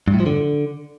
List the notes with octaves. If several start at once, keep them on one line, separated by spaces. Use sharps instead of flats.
G2
A2
F3
D3